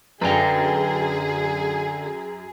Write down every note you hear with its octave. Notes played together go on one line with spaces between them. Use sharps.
F#2 D3 G#4 B4 D5 G5 F7